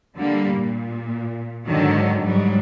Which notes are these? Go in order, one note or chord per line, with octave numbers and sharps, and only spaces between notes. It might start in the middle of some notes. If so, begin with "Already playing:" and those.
D3 G3 A#3
A#2
G#2 D3 D#3 F#3
G#2 F#3 G3